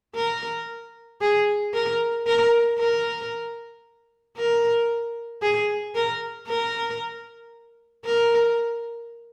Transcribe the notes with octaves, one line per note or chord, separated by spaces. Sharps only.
A#4
G#4
A#4
A#4
A#4
A#4
G#4
A#4
A#4
A#4